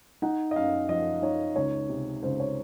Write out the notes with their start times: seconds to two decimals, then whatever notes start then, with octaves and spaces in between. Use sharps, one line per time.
0.22 D#4 F#5
0.51 D#5
0.56 F#2 F5
0.89 F3 D#5
1.22 D#4 C#5
1.56 C#2 C#5
1.89 C3
2.23 C#2 C5
2.40 C#5